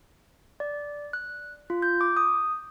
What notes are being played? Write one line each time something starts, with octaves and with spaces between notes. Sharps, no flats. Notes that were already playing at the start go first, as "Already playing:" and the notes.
D5
F#6
F4
G6
D6
D#6